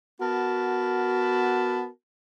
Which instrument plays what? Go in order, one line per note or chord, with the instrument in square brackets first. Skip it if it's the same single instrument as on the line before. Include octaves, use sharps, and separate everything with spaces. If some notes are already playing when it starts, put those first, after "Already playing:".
[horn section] B3 F#4 A#4 A5 B5